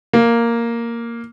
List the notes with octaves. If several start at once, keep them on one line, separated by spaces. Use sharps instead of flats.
A#3